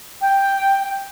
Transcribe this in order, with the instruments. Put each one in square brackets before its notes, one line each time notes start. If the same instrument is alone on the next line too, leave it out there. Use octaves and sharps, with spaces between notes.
[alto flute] G5